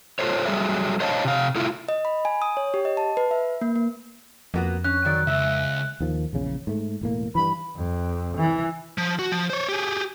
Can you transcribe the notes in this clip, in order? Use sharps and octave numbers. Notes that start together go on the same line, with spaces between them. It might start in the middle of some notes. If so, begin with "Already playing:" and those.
F4 A4 C5 C#5
F#3 G3 G#4 A4 C#5 E5
C5 C#5 D#5 F5 G#5 A5
C3 F5
A3 E4 F4
D#5
B5
G#5
D#6
C#5
G4
D#5
A5
B4
E5
A#3
A#3
F2 A#3 B3 F#4
C#4 F#6
D#3 F#3 D5
C#2 E5
D#2 D#3 F3
A#1 E2 C#3
G#2 A3
E1 A2 A#3
G2 E3 B5
F2
E3
F3
F#4
F3
C5 C#5
G4 G#4